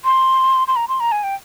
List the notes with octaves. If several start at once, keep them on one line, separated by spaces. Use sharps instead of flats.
C6
C6
A#5
C6
A#5
G#5
G5